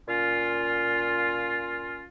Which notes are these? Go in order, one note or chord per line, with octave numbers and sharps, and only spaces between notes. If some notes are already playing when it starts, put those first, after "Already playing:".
A#2 C#4 F4